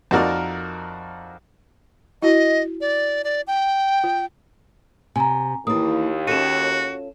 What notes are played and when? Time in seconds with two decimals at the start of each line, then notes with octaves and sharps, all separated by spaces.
0.11 F2 D#4 F#4 A#4 D5 F6
2.22 E4 F#4 D#5
2.81 D5
3.24 D5
3.47 G5
4.04 F4
5.16 C3 G#5 A#5
5.67 D#2 E3 A#3 E4 D#6
6.27 C#4 F4 F#4 A4 D#7 E7